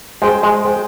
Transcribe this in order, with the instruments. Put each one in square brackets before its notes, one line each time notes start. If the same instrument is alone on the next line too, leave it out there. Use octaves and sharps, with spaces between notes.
[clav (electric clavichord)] G#3 [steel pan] G#4 C5 G5
[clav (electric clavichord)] G#3
[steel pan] G#4 C5 G5